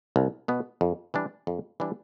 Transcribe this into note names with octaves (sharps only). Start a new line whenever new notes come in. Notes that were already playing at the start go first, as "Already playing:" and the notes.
C2
B2 B3
F2
E3 G3 D4
F2
E3 G3 D4